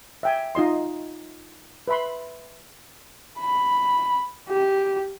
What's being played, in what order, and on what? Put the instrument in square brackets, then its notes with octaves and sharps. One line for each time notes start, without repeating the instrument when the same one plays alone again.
[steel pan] E5 G5 G#5
D#4 F4 D#5 C6
B4 E5 B5 C6
[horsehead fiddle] B5
G4